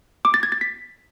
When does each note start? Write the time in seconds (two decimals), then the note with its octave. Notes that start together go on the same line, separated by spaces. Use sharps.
0.25 D6
0.34 A6
0.43 G#6
0.52 A6
0.61 B6